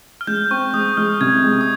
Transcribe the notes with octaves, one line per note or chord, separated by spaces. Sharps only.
F6
G#3 G6
C4 C#6
G#3 D#6
G#3 F6
C2 G#6
G#3
D#6